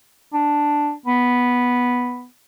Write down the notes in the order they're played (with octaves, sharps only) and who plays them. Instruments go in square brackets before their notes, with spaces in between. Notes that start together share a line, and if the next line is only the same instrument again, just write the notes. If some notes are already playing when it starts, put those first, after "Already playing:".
[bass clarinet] D4
B3